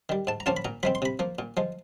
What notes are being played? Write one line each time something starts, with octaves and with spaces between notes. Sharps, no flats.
D#3 G3
G#2 A5
A#5
F3 A#3 C#4 F4 A5
B5
A#2 A#5
F3 G#3 C4 B5
C6
C3 B5
F3 A#3
A#2
F3 G#3